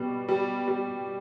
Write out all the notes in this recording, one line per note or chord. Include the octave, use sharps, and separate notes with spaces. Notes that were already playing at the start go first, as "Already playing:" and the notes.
Already playing: B2 G3
G3
G3